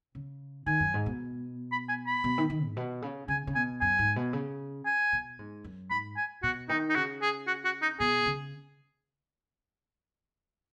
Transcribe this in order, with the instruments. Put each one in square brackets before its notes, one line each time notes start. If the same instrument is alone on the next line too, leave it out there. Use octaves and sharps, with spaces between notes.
[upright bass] C#3
[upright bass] D#3 [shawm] G#5
[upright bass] F#2
G#2
B2
[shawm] B5
G#5
B5
[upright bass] B2
D#3
D#3
G#2
B2
C#3
[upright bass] C#3 [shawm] G#5
[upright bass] C#3
[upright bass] B2 [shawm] G#5
[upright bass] F#2 [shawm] G#5
[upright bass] G#2
B2
C#3
[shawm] G#5
[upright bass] B2
G#2
F#2
[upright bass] G#2 [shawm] B5
[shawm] G#5
[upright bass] B2 [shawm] F#4
[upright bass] D#3 [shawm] D#4
[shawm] D#4
[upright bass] C#3 [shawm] F#4
[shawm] G#4
F#4
F#4
D#4
[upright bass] B2 [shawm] G#4
[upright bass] C#3